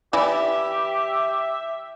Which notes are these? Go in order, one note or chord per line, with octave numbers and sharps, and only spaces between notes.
E3 E4 G4 D5 E5